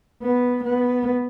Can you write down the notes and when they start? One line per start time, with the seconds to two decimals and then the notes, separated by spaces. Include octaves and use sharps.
0.23 B3
0.64 B3